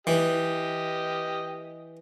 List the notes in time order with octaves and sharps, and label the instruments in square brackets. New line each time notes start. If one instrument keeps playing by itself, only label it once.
[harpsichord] E3 [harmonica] G4 D#5